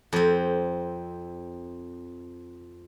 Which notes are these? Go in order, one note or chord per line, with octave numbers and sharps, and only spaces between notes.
F2 C4